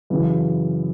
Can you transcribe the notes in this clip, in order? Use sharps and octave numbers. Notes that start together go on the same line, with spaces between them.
F#2 C#3 E3